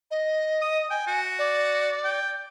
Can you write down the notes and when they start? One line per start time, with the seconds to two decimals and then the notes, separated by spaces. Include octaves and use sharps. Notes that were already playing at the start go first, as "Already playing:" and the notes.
0.11 D#5
0.62 D#6
0.90 G5 G#5
1.07 F#4
1.39 D5
2.04 G5